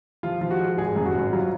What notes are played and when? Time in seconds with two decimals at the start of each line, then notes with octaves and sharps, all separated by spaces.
0.23 F3 F4
0.41 F3
0.51 F#4
0.59 G#3
0.78 G#1 G#4
0.96 F#2
1.06 F#4
1.15 G#1
1.33 F#3 F4